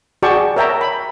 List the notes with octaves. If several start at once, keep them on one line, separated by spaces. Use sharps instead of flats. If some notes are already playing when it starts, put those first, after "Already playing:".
F#4 G#4 D5 G5 A5 C#6
A#4 C#5 E5 G5 A5 A#5
B5